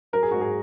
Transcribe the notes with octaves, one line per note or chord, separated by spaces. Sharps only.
F#3 A#4
G#4
G#2 F#4
G#4